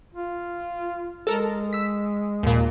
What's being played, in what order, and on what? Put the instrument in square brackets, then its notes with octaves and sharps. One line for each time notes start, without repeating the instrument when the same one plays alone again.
[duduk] F4
[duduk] G#3 [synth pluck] A4 A#4
[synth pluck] E6 B6
D#2 A#2